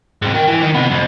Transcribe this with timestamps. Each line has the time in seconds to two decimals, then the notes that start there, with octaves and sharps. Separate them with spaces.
0.22 G#2 C3
0.34 A#4 G5
0.48 E3
0.63 D#3
0.75 C3 B3
0.92 F2